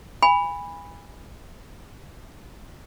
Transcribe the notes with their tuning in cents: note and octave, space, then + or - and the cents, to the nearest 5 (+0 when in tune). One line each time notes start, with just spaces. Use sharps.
G#5 -25 B5 +0